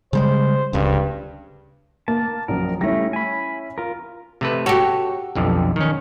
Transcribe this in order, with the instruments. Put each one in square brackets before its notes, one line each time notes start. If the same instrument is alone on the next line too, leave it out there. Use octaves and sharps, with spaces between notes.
[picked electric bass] C#3 G3 G#3 [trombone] C5
[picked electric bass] D1 C#2 C#3 [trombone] G2
[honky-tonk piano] A#3 [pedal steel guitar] A5
[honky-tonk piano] A#1 F#2 F#3 [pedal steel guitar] A#4
[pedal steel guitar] G3 A3 [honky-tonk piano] C#4 E4 A#6
[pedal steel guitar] G#5 B5
F4 A#4
[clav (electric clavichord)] C3 A3 B4
[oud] F#4 G4 [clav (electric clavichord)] A4 C#5
[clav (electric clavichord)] B1 F2 D3
D#3 C#4